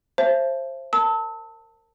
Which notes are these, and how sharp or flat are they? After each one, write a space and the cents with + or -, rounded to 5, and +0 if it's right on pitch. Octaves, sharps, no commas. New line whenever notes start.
C5 +20 E5 +40 A5 -10
A#4 -20 A5 +20 E6 -30